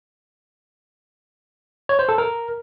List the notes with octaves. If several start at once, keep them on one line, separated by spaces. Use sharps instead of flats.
C#5
C5
A4
A#4